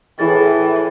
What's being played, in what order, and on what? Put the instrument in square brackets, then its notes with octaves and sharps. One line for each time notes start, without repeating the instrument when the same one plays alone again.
[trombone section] A2 [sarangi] E3 [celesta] E4 G#4 A6